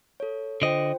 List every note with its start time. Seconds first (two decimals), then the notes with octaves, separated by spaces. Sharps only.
0.20 A4 C#5
0.62 D3 F4 C5 D#5 G5